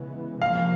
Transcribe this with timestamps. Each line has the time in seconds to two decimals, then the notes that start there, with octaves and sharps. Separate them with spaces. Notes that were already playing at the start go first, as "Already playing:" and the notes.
Already playing: C#3 E3 G#3 B3
0.41 C3 F3 A#3 F5